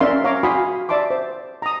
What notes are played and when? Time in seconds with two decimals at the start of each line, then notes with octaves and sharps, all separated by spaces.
0.01 C#4 A#4 D5 E5 F5 C6
0.24 C#5 F5 A#5 D6
0.43 F#4 F5 G#5 B5 C6 D#6
0.89 D5 E5 A5 C6 D6
1.10 C5
1.62 A#5 D#6